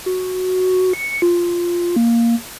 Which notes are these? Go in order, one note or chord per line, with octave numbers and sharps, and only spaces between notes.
F#4
C#7
F4
A#3